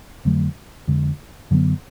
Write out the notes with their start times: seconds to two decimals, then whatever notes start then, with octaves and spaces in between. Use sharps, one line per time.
0.25 F2 D3 F#3 A3
0.87 F2 D3 G#3
1.51 F#2 D3 F#3 B3